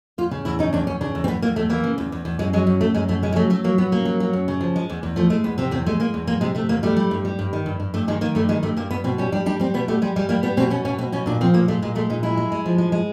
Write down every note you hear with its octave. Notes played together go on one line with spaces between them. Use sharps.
E2 F4
C#3
E2 E4
C#3 D#4
E2 D4
E2 C#4
C#3 D4
E2
C4
E2 B3
E2 A#3
E2 A3
E3 A#3
C#3
E2
E2
E2
F#2 G#3
F#3 G#3
F#2
F#2 A3
F#2 G#3
F#2 A3
C#3 G#3
G#3
F#3 A3
F#3 A3
F#3 A#3
F#3 B3
C#3 A#3
F#3
F#3
F#2
C#3
F3
G#3
E2
E2
F3 A3
G#3 A3
E2 B3
C3 C4
E2 C4
G#3 A3
G#3 A#3
E2
G#3 A#3
C3 G#3
C3 A3
E2 A#3
G3 A3
G3
G2
G3
G2
D#3
G2
G2
G2 A3
D#3 G#3
D#3 A#3
G2 A3
D#3 G#3
G2 A3
G2 A#3
G2 B3
B2 C4
G3 C#4
G3 D4
G3 D4
G3 C4
B2 B3
G3 A3
G3 G#3
G3 G#3
G3 A#3
G3 B3
B2 C4
B2 C#4
B2 C#4
B2 C4
B2 C#4
A#2 D4
F3 C4
A#2 A#3
G#3 A3
A#2 G#3
G#3 A3
A#2 D#4
G#3 E4
G#3
G#3
F3
G#3
G#3